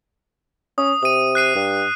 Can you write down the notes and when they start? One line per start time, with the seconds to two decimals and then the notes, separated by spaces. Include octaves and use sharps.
0.78 C#4 D#6
1.03 C3 D#6 D#7
1.35 F#6 C7 D#7
1.56 G2